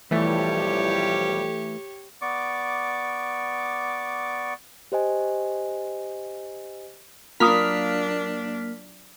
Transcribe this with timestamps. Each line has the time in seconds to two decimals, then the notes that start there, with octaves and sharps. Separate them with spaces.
0.11 B1 E3 F3 G3 A3 G4 C#5
2.22 B3 D5 C#6 D6
4.92 G4 C5 D#5 G#5
7.40 F#3 A#3 D4 F4 D#6 F6 B6